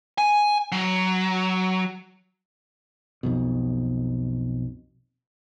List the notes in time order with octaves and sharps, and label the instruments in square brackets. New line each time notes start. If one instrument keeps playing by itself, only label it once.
[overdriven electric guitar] G#5
F#3
[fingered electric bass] B1 F2 B2